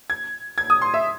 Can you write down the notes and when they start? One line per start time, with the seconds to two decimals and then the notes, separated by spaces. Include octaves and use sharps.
0.10 G#6
0.58 G#6
0.70 D#6
0.82 C6
0.94 E5